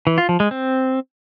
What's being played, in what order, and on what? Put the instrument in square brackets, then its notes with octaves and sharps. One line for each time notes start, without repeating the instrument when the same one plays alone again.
[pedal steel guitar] E3
F4
F3
G#3
C4